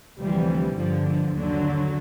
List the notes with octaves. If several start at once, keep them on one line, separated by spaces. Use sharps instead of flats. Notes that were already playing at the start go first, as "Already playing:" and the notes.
D2 C3 E3 F3 G3
G1 G2 D3 F3
F3
D#2 D3 F#3